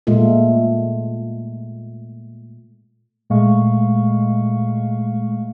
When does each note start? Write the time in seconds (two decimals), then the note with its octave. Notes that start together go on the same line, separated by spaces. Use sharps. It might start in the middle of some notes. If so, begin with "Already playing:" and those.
0.07 A#2 G#3 A3 F4
3.30 A#2 G#3 A3 F5 C#6